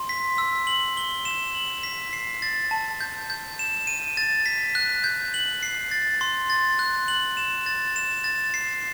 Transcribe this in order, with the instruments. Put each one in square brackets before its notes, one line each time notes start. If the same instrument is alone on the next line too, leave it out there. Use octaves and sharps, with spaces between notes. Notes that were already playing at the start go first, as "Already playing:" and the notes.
Already playing: [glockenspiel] C6
B6
E6
F#7
G7
E7
F#7
B6
C7
A6
A5
G6
G6
E7
D#7
A6
B6
F#6
G6
F#7
C7
A6
C6
A6
F#6
F#7
E7
A6
E7
A6
C7